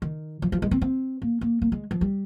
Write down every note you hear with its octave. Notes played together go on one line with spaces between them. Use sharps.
D#3
F3
F3
G#3
C4
C4
A#3
A#3
A#3
G#3
F3
G3